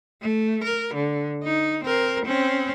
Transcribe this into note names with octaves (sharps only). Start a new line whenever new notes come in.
A3
A#4
D3
D#4
C4 A#4
C4 C#4